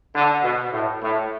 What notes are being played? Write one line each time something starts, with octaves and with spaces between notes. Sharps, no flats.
D3
B2
A2
A2